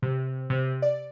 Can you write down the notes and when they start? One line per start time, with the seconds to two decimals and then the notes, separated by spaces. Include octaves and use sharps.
0.02 C3
0.50 C3
0.82 D5